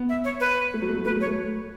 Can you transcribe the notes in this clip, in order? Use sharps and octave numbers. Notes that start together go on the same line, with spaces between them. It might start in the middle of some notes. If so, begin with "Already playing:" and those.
Already playing: B3
E5
C#5
B4
A3
F#3
A3
F#3
A3 B4
A3
C#5
A3